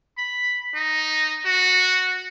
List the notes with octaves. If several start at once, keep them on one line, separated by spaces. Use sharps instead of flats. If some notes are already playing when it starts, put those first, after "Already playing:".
B5
D#4
F#4